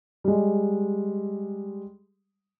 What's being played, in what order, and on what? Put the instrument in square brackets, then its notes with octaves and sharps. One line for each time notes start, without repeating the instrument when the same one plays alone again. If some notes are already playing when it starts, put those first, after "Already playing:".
[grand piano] G3 G#3